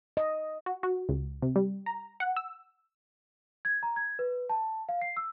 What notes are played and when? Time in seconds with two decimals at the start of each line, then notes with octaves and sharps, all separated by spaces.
0.17 D#5
0.66 F#4
0.83 F#4
1.09 C#2
1.42 C3
1.56 G3
1.86 A#5
2.20 F#5
2.37 E6
3.65 G#6
3.83 A#5
3.96 G#6
4.19 B4
4.50 A5
4.89 F5
5.02 C7
5.17 E6